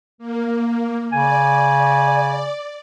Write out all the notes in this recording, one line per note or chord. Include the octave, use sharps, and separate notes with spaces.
A#3
C#3 D5 G#5